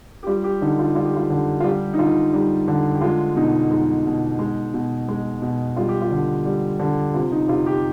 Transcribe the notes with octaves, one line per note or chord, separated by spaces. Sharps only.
G4
G3 F4
G4
D3 D#4
F4
G3 F4
G4
F4
D3
F4
G3 G4
D#4
D3 F4
G3 D#4
D3
G4
G#3 F4
B2 D#4
G#3 D#4
B2
G#3
B2
G#3
B2
G3 F4
G4
F4
D3
G3
D3
C3 F4
D#4
C3 F4
G4